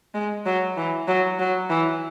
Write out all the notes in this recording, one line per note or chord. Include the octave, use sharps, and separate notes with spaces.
G#3
F#3
E3
F#3
F#3
E3